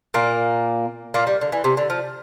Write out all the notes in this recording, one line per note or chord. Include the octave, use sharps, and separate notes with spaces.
A#2 A#3
A#2 A#3
G3
D3
E3
C3
D3
F3